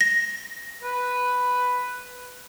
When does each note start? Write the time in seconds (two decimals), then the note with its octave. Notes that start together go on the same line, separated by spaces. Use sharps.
0.01 A#6
0.83 B4